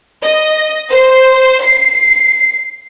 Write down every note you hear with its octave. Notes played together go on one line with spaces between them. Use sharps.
D#5
C5
C7